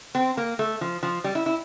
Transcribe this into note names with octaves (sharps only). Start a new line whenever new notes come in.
C4
A#3
A3
F3
F3
G3
E4
E4